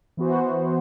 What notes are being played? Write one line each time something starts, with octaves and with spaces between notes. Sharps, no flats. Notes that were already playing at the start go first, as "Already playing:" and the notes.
E3 B3 F#4 C5